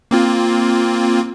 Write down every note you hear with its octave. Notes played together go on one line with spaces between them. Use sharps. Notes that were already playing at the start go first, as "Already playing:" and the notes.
A#3 C4 F4